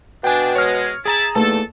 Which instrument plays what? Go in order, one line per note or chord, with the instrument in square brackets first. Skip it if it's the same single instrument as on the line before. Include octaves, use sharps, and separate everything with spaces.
[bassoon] B2 [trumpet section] D4 [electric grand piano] G5 G#5
[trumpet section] G#3 [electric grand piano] C#5 F6
[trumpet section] E4 A5 [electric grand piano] G#4 A#5 E7
[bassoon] E2 [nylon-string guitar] A3 A#3 D#4 [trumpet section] A4 [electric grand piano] A5